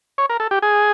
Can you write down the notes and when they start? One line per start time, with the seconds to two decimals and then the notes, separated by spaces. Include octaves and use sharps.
0.18 C#5
0.29 A#4
0.40 A4
0.51 G4
0.62 G#4